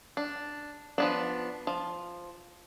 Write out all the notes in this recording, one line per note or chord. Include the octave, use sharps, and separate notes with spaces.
D4
F3 B3 D4
F3